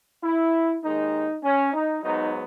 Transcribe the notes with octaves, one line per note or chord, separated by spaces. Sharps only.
E4
D#2 D#3 G#3 D#4
C#4
D#4
G#2 F#3 B3 D#4